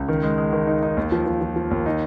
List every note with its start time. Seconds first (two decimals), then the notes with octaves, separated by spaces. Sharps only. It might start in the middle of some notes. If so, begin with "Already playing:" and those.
Already playing: C#2
0.09 D#3
0.23 G#3
0.38 G#3
0.53 D#3
0.67 D#4
0.83 D#4
0.97 D#2
1.12 F3
1.26 F3
1.41 F3
1.56 F3
1.71 D#2
1.86 D#4